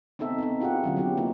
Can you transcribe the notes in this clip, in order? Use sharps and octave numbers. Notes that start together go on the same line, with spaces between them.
B3 C4 D#4 A4 E5
B3 C4 D#4
E4 F4 G4 G#4 F#5
D3 F#3 C#4
F#3 B3 E4 G4
A#3 D#4 F4